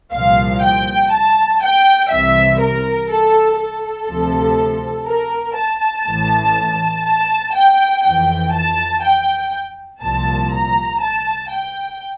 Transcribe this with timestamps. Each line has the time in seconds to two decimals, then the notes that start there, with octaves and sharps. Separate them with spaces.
0.12 C2 A#2 F3 F5
0.62 G5
1.11 A5
1.62 G5
2.10 C2 C3 E3 E5
2.60 A#4
3.09 A4
3.60 A4
4.09 D2 C3 F3
5.07 A#4
5.57 A5
6.07 A1 A2 E3
7.05 A5
7.55 G5
8.04 F2 E3 G5
8.53 A5
9.03 G5
10.02 C2 A#2 F3 A5
10.52 A#5
11.01 A5
11.50 G5